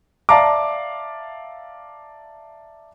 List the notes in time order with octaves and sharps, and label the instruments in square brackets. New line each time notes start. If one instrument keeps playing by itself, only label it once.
[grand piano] D5 E5 F5 A5 A#5 D6